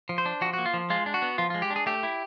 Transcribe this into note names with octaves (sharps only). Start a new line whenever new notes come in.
F3
C5
D4
F3 F#4
A#3 F#4
F4
F3
G#3 F4
D4
F#4
B3
F3 F4
G#3 F4
G4
D4
G#4
A3 G4
E4